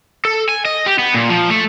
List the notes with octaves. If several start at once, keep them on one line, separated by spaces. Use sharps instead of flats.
A4
G#5
D#5
G4
B3
A#2
F3
A3